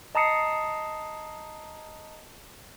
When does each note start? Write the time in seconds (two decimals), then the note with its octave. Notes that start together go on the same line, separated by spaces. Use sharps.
0.15 D#5 A5 A#5 D#6 C7 C#7